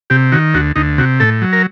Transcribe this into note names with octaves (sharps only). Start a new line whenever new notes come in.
C3 G4
D#3 F#4
D2 F#4
D2 D#4
C3 F#4
A2 A4
F#3
A#4